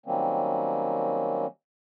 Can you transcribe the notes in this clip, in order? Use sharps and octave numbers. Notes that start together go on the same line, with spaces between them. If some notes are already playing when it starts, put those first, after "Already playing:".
D#3 F#3 G3 A#3 C4 C#4